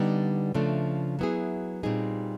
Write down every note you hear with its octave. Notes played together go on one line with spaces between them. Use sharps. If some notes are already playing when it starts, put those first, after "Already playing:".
Already playing: D3 G3 B3 D#4
C#3 F3 A3 D4
F#3 B3 E4 G#4
A#2 G3 C4 D#4 G#4